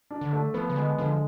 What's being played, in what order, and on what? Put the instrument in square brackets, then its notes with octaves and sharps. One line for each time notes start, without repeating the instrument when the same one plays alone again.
[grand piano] D4
[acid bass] D3
[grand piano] A3
[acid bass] F3 [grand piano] B3
[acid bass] C#3
[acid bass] D3 [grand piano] G#3
[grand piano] D3 [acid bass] F3